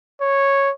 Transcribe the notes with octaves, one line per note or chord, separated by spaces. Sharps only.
C#5